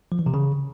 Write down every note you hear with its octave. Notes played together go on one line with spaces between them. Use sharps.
F3
E3
C3
C#3